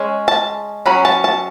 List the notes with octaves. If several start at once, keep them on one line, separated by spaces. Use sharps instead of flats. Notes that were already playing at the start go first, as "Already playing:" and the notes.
Already playing: G#3 C#4
A5
F#3 C#4 B5
A5
A5